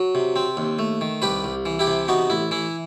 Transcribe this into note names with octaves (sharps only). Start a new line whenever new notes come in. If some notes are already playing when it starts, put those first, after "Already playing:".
Already playing: F#3
C3
C4
D#2
A3
D#3
C2 G4 B4
C2
E3
E4 G4
C3
B3 D#4 F#4
A1 E4
E3 E4